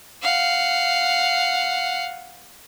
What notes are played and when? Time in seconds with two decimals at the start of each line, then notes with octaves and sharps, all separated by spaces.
0.22 F5 F#5